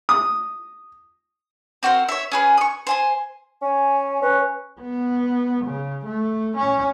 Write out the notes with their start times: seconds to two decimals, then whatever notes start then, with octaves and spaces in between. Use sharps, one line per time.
0.09 D#6
1.83 C4 F#4 A#4 C5
2.08 C#5 E5
2.32 C#4 G#4 B4
2.57 C#6 D#6
2.87 C5 G#5 C6
3.62 C#4 G#5
4.22 C#4 B4
4.80 B3
5.65 C#3
6.05 A3
6.56 C#4